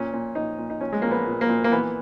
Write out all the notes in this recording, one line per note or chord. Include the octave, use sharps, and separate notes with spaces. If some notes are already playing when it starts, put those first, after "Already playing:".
Already playing: A#2 C#4
A#2
A#2 D#4
A#2
D#4
A#2 C#4
G#3
A#2 A#3
B3
A#2
A#3
A#2
A#3
E3 B3